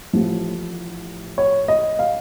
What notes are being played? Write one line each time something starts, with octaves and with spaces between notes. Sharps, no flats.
A1 A2 F3
C#5
D#5
F5